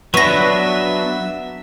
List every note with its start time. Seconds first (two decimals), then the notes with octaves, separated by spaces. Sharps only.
0.14 F#3 B3 D4 F#4 B4 E5 C#6 A#6